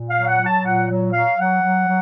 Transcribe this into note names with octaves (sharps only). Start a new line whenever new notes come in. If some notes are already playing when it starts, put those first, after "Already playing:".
Already playing: A#2
F5
F#3
F#5
F#3
A5
A#2 F#5
F#3
F#3 F5
F#3 F#5
F#3
F#3